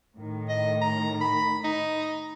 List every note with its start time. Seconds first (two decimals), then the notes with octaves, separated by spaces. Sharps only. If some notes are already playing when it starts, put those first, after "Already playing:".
0.15 A2 D#3
0.49 D#5
0.81 A#5
1.21 B5
1.64 D#4